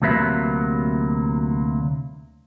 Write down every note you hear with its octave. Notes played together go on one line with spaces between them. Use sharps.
D2 C3 F#3 A#3 B4 E5